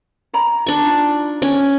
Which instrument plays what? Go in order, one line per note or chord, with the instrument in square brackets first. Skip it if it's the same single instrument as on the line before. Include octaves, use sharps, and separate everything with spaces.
[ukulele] C#5 A#5 B5
[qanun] D4 C#6
[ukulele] D#4 F4
[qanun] C#4